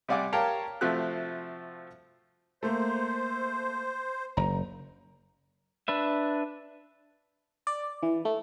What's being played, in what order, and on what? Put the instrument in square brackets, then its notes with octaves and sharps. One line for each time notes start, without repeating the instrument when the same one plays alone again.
[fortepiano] C3 G3 D5 F#5 G#5 D6
G4 A#4 C#5 F5 G5 A5
C3 F3 A3 C4 F#4 F#6
[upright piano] A3 A#3 [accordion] C5
[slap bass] F#1 [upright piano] A#5
[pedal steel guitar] D4 B4 E5
[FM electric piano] D5
E3
A3